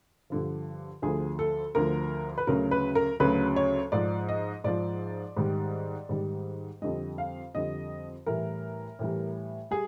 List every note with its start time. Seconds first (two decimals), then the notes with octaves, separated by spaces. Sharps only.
0.30 G2 D3 F3
1.02 D2 D3 F3 G#4
1.39 A4
1.75 D2 D3 F3 A#4
2.38 B4
2.47 D2 C#3 F#3 A#4
2.71 B4
2.95 A#4
3.20 D2 C#3 F#3 B4
3.56 C#5
3.92 G#2 F3 D5
4.29 D#5
4.64 G#2 F3 D5
5.37 G#2 D#3 G3
6.09 G#2 D#3 G3
6.82 F2 D3 G3 D#5
7.18 F5
7.55 F2 D3 G3 D#5
8.26 A2 E3 G3 A#4
8.99 A2 E3 G3
9.71 G3 G#4